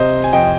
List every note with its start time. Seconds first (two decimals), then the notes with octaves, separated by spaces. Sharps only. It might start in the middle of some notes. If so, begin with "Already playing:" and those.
Already playing: C3 C5 D#5
0.24 G#5
0.33 F2 D#5 G5